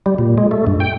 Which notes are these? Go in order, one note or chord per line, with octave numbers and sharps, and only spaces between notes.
G3
A#2
G#3
A3
G2
G5